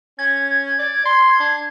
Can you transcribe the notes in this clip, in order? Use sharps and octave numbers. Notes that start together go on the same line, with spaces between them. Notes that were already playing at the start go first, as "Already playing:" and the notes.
C#4 G#6
D5
C6
D4